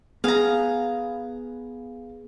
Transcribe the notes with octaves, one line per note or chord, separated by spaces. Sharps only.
B3 G#4 F5 F#5 A#5